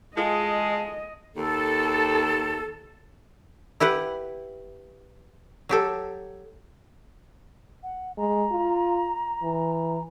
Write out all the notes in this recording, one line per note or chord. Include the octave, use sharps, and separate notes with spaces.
G#3 F4 G#4 A4 D#5 A5
D#2 A4
E4 G4 B4 F#5
F#3 G4 A4
F#5
G#3 A#5
F4
E3